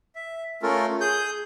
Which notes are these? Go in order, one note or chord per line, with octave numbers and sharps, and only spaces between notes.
E5
A3 C#4 F4 A4 A#4
G#4 G6